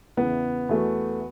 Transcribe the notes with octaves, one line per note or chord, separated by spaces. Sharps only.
E2 C#3 E3 B3
E2 E3 A3 F#4